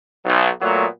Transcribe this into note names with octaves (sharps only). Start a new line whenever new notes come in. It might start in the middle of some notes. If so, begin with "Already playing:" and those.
B1
A#2 F#3 A3 B3